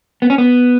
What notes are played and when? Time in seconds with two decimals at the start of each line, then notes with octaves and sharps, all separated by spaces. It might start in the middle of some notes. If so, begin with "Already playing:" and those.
0.22 B3
0.30 C#4
0.38 B3